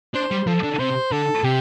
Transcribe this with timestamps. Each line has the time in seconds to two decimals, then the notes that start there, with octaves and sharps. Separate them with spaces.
0.15 D4 C5
0.31 G3
0.47 F3 A4
0.63 D3
0.79 C3 C5
1.11 D3 A4
1.43 C3 G4